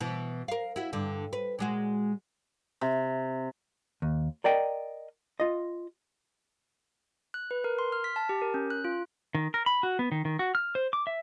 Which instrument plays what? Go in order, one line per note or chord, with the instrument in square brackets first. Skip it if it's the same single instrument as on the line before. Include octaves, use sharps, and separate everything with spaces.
[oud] B2 E3
A#4 F5
E4 F#4
G2 D3
B4
A#2 G#3 F#4
[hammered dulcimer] C3
[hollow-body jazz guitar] D#2
A#4 D5 D#5 G5
F4 D#5
[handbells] F#6
B4
A#4
C6
F6
B6
A5
G4
A#4
C#4
F#6
F4
[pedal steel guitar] D#3
A#4
B5
F#4
B3
D#3
D#3
F#4
F6
C5
D6
E5